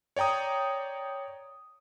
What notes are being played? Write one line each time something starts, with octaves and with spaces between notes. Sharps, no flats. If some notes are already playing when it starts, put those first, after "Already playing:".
C#5 D5 G5 A#5 D#6